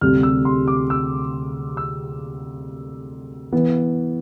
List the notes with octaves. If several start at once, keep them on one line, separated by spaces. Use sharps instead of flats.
D2 C3 G3 C4 F6
E6
C6
D6
E6
E6
E3 B3